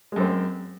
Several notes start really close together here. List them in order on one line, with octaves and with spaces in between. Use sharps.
G#3 F#2 C4